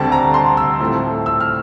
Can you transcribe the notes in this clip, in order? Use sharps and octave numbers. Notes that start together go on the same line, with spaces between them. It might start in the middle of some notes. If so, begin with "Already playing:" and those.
Already playing: D2 D3 G3 C4 A5
A#5
C6
E6
A2 F3 A3 C4
E6
F6